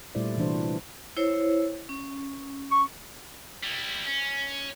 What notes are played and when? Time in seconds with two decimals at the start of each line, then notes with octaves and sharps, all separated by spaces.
0.15 A#2 G3 A3 E4 C5 D5
0.37 C3 E3 G3 D4 F#4 C5
1.17 E4 C5 C#5
1.89 C#4
2.71 C#6
3.64 G3 E4
4.07 C#4